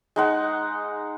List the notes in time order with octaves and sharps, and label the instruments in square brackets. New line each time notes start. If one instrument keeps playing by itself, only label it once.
[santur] G#3 D#4 F#5